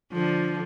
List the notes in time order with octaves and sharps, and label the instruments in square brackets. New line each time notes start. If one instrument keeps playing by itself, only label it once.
[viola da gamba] D3 F3